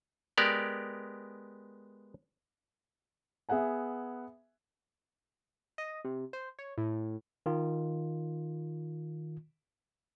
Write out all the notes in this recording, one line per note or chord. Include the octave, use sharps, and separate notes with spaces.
G#3 B3 G4 A#4 D5
B3 G#4 E5 F#5 G#5
D#5
C3
C5
C#5
A2
D#3 F4